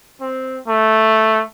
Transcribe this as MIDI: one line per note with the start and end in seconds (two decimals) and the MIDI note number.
0.21 0.59 60
0.68 1.43 57